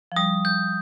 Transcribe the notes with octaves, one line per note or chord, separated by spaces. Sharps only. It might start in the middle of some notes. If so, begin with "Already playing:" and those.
F3
G3 D#6
G6